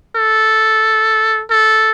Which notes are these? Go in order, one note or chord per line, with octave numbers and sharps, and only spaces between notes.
A4
A4